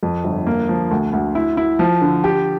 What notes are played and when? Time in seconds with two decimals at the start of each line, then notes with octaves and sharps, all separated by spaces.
0.03 F2
0.24 G1
0.47 A#3
0.69 F3
0.91 D2
1.13 D2
1.35 E4
1.57 E4
1.79 F3
2.01 D3
2.24 G4